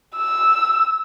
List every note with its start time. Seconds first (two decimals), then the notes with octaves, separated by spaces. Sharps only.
0.16 E6